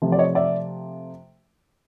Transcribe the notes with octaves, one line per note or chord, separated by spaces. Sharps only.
C3 F3 A3
D5
C#5 D#5
D5 E5